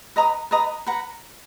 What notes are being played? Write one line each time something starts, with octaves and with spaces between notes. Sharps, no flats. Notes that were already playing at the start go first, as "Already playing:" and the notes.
B4 D#5 A#5 D#6
B4 D#5 A#5 D#6
B4 F#5 A#5